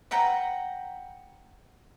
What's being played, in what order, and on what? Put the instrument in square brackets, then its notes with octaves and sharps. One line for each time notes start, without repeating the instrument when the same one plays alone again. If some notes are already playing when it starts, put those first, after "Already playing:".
[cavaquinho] B4 F#5 G5 A#5